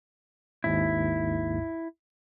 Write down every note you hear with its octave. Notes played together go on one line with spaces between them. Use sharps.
G#1 D#2 G#2 E4